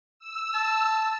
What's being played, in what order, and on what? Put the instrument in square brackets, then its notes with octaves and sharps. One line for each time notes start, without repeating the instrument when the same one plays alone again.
[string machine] E6
[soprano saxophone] A5